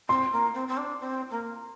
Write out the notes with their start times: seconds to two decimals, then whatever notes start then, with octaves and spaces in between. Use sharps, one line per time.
0.09 C4 C6
0.32 A#3
0.54 C4
0.68 C4
0.77 D4
1.01 C4
1.31 A#3